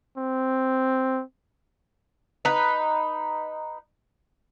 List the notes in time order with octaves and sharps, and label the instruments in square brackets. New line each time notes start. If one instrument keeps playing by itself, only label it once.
[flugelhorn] C4
[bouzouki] D#4 B4